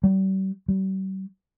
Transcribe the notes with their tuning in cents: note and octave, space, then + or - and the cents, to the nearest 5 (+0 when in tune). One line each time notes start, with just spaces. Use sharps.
G3 -40
G3 -45